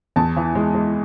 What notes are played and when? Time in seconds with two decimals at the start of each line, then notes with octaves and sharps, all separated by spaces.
0.16 E2 A5
0.37 E3
0.55 G#3
0.75 G#3